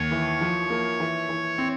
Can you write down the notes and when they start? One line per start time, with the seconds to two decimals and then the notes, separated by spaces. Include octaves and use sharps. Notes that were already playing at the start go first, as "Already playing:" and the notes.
Already playing: D#2 C#5
0.11 E3
0.41 F3
0.70 A#3
1.00 E3
1.29 E3
1.58 C4